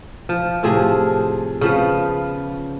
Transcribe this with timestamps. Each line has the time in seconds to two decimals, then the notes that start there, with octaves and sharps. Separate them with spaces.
0.29 F3
0.63 A2 C3 F3 G#4
1.61 C#3 F3 B3